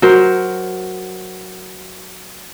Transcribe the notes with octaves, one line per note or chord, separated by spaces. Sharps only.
F#3 A#4 C5